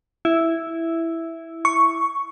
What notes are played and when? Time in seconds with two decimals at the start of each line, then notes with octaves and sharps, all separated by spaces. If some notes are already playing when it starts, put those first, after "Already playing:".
0.25 E4
1.65 C#6